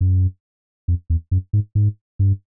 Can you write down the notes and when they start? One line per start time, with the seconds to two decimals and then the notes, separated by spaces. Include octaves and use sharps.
0.01 F#2
0.88 F2
1.10 E2
1.31 F#2
1.53 G#2
1.75 G#2
2.19 G2